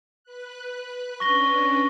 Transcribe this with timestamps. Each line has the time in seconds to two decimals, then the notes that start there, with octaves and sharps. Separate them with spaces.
0.24 B4 F#6
1.20 C#4 D4 B4 C#6 A#6 G7